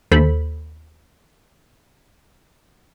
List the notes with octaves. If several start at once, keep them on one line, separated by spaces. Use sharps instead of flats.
D#2 A4 C5 B5